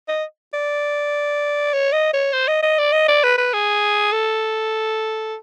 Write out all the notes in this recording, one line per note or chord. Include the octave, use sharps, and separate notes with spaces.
D#5
D5
C#5
D#5
C#5
C5
D#5
D#5
D5
D#5
D5
B4
B4
G#4
A4